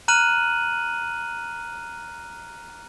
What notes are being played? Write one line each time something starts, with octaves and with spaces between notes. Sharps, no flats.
A#5 F6 F#6 D#7 F#7